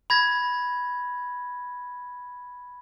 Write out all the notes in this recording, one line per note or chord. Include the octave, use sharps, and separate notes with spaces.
B5 G#6 A#6